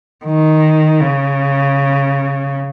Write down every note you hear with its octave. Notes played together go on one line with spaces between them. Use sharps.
D#3
C#3